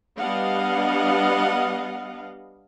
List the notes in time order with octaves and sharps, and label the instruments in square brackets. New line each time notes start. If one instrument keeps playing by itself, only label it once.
[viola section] G3 B3 D4 D#5 F5 F#5